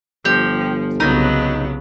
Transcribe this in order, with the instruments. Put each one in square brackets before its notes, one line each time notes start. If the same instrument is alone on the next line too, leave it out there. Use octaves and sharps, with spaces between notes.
[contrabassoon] G1 [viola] F3 [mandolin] G4
[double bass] C2 C#3 [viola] F#3 B3 [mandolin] D#4